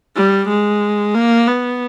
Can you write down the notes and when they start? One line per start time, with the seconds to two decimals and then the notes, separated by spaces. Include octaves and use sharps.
0.16 G3
0.49 G#3
1.15 A#3
1.47 B3